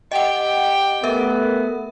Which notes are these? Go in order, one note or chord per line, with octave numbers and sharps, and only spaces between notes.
G4 D#5 F#5 G5
A3 B3 A#4 E5